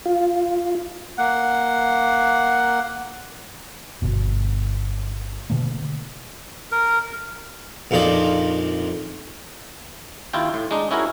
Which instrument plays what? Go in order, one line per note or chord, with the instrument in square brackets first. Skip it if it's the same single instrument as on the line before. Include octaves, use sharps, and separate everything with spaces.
[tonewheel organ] F4
[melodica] A#3 F#5
[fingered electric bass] G1 B2
B2 D3 A3 A#3
[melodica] A#4
[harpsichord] A#1 F2 F3 D#4 D5
[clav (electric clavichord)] D#2 E4 F4 G5
A2
G#3 D4 D#4
C#4 E4 F#4 G#4 A#4